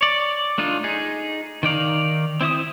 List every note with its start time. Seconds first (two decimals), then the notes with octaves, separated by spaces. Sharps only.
0.01 C#5 D5
0.58 A3 D4 D#4 F4
0.84 D#4 G#4
1.63 D#3 D#4 D5 F5
2.41 C4 E4 E5 D#6